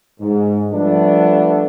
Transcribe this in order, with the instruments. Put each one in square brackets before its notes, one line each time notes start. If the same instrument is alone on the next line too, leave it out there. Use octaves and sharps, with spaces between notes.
[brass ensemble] G#2
F3 G3 A3 B3 D4